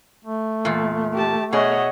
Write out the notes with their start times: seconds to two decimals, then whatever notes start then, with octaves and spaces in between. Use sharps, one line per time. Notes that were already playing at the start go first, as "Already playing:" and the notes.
0.24 A3
0.65 E2 A#2
1.14 G4 A5
1.53 B2 G#4 C#5 D#5 E5 F#5